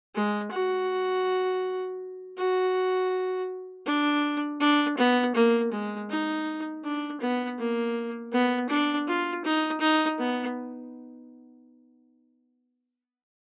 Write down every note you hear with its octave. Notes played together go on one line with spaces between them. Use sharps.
G#3
F#4
F#4
D4
D4
B3
A#3
G#3
D#4
D4
B3
A#3
B3
D4
F4
D#4
D#4
B3